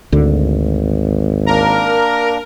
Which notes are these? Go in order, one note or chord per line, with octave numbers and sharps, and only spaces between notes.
G#1 D2 D3
A#3 D4 A#4